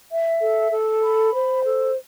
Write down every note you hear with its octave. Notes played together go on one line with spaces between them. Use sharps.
E5
A4
A4
B5
C5
A4